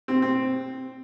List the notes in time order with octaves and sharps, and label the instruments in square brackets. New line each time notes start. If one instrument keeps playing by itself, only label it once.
[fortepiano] C4
C4